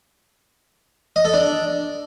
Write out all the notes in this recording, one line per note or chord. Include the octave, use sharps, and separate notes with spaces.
D#5
A4
D4